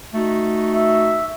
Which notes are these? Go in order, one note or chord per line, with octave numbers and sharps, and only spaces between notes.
A3 D#4 F#4
E5